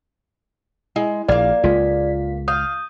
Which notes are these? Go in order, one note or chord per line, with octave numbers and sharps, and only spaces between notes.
G#3 E4
A#1 A#3 D5 F5
C#2 G#3 F4 B6
F5 D#6 G6